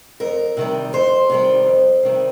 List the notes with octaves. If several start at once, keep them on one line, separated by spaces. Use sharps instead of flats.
F2 A#4
C3 D#3 G3
F2 C5
C3 D#3 G3
F2
C3 D#3 G3